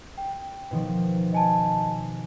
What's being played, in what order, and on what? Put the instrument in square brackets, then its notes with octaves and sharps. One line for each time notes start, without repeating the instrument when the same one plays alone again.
[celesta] G5
[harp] B2 D#3 F3
[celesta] D#5 G#5 A5